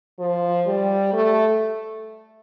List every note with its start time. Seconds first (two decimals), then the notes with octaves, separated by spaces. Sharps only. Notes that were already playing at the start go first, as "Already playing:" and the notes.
0.19 F3
0.66 G3
1.13 A3